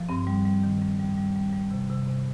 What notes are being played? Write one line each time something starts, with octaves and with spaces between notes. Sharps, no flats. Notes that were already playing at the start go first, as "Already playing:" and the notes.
Already playing: F3
G2 C4
G3
G3
D#3
G3
G3
G3
G3
G3
C3
C3
C3